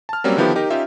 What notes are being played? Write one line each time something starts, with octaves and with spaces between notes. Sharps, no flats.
A5 F6
F#3 G3 A#3 C4 C#4
D3 D#3 F3 B3 E4 G4
D#4 G4 A#4
C#4 D#4 F4 G4 E5